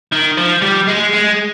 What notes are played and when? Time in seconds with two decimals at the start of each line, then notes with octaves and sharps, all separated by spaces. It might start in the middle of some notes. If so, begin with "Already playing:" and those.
0.12 D#3
0.37 F3
0.62 G3
0.88 G#3
1.14 G#3